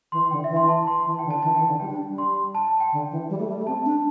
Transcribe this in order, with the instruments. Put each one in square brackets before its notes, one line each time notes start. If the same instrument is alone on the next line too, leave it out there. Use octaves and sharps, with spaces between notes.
[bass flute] E3 [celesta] C6
[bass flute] D3 [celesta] G5
[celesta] E5
[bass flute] E3
[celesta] C6
A5
C6
[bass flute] E3 [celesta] A5
[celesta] G5
[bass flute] D3
[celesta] A5
[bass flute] E3 [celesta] A5
[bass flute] E3 [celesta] G5
[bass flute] D3
[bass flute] G3 [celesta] G5
[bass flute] D4
G3
[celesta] C6
A5
A5
G5
[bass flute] D3
E3
G3
A3
G3
A3
[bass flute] C4 [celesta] A5
[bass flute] D4